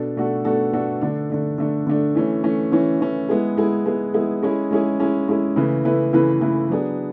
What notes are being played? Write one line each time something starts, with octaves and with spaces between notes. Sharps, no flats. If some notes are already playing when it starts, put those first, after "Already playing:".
Already playing: B2 D4 A4
B2 A3 D4 F#4 A4
B2 A3 D4 F#4 A4
B2 A3 D4 F#4 A4
D3 A3 D4
D3 A3 D4
D3 A3 D4
D3 A3 D4
E3 A3 C#4
E3 A3 C#4
E3 A3 C#4
E3 A3 C#4
G#3 B3 E4 G#4
G#3 B3 E4 G#4
G#3 B3 E4 G#4
G#3 B3 E4 G#4
G#3 C#4 E4 G#4
G#3 C#4 E4 G#4
G#3 C#4 E4 G#4
G#3 C#4 E4 G#4
C#3 E3 A3 E4 B4
C#3 E3 A3 E4 B4
C#3 E3 A3 E4 B4
C#3 E3 A3 E4 B4
F#3 B3 D4 G#4